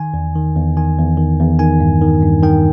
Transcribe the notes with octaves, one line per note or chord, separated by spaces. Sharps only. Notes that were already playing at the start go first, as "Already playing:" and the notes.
Already playing: D#3 G#5
E2
D#3
E2
D#3 G#5
E2
D#3
E2
D#3 G#5
G2
D#3
G2
D#3 G5